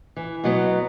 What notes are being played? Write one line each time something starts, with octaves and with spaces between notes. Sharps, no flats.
E3
B2 F#3 B3